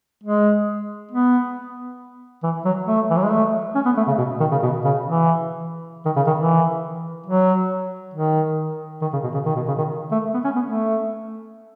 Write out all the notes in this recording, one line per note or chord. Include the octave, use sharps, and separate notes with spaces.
G#3
B3
E3
F#3
A3
E3
F#3
G#3
A3
C#4
B3
A3
C#3
B2
D#3
C#3
B2
C#3
E3
D#3
C#3
D#3
E3
F#3
D#3
D#3
C#3
B2
C#3
D#3
B2
C#3
D#3
A3
B3
C#4
B3
A3